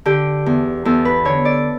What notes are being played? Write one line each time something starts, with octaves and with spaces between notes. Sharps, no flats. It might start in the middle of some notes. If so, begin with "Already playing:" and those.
D3 G4
E2
E2 A4
B4
D3 C#5
D5